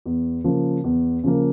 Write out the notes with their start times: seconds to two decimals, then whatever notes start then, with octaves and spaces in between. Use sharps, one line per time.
0.06 E2
0.44 C#3 F3 A#3
0.84 E2
1.24 C#3 F3 A#3